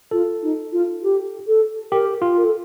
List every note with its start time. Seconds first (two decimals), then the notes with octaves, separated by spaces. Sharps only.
0.11 F4 A4
0.42 D#4
0.72 F4
1.02 G4
1.47 A4
1.91 G4 A#4
2.22 F4
2.37 A#4
2.43 A4